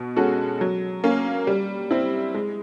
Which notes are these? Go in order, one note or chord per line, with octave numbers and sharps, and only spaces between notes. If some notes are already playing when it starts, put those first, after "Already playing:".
Already playing: B2
G#3 C#4 F#4 A4
F#3
A#3 C#4
G3
C4 E4
G#3